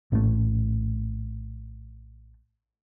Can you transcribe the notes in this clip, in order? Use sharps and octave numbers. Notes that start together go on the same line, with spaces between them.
A#1 A2 D#3 A3